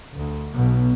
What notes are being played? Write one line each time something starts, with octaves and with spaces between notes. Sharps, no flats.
D2
B1 B2